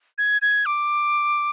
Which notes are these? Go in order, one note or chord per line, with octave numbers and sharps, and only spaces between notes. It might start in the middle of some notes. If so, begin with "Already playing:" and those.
G#6
G#6
D6